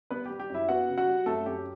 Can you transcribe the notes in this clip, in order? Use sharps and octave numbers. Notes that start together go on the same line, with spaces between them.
G3 B3 B4
G3 G4
G4
F#2 E4 E5
B3 F#4 F#5
C#3
F#4 F#5
G3
F#2 A3 A4
F#2 G4